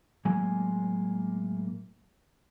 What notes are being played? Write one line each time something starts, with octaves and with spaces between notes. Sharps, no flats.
A2 F#3 G#3 A#3 G#5